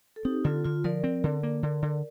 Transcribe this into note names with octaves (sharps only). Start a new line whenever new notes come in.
A4
C4 D#4 G4
D3 F4 A4
D3 F4
F3 A#4 D5
C4
D3
A#3
D3
D3